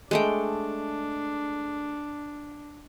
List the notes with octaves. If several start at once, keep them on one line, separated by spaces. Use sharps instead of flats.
G#3 A3 D4 G5